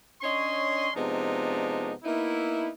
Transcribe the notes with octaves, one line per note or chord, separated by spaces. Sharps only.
C#4 D4 C#5 D#5 C6
C3 F3 G#3 B3 D4 D#4
A#3 B3 D#4 E4